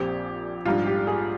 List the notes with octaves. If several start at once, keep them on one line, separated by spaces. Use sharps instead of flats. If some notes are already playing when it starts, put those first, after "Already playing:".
Already playing: A#1 A#2 F3 C4 G4
A#1 G#2 G3 D4 F4
G4
G#4